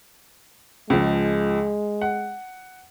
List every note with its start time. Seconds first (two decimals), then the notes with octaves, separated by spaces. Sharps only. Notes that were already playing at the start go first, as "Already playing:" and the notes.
0.90 C#2 F3 G#3
2.01 F#5